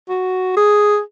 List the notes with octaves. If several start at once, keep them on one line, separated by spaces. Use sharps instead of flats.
F#4
G#4